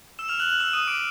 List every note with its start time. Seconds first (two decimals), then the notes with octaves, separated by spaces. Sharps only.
0.19 E6 E7
0.28 F6 F7
0.39 F#6 F#7
0.49 F#6 F#7
0.60 E6 E7
0.73 D#6 D#7
0.87 D6 D7